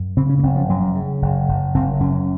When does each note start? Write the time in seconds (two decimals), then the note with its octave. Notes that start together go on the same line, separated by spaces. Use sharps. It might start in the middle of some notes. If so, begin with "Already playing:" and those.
Already playing: F#2
0.17 C#3 C4
0.29 C#4
0.39 A#3
0.43 F#1 C4
0.56 F3
0.69 F#2 F#3
0.95 C#3
1.22 F#1
1.49 F#1
1.74 F#1 C4
2.00 F#2 C#4